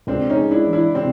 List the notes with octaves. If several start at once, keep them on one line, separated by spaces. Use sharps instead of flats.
C#2 C4 D4
C#4 D#4
G#3
D4 E4
E3
D4 E4
C3 C4 D4